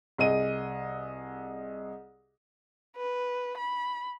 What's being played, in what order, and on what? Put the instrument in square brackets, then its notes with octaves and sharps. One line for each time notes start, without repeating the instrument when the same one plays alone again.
[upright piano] C2 G#4 D#5 D#7
[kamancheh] B4
B5